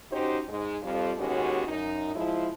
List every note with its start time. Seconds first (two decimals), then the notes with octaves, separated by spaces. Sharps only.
0.11 C#4 D#4 F#4 G4 C5
0.49 G#2 G#3
0.83 F2 F3 G3
1.17 D#2 G#3 B3 C#4 F#4 G4
1.68 F#2 D#4
2.15 F3 G#3 E4